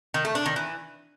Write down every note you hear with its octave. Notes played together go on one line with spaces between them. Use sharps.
D#3
A3
D4
D#3
E3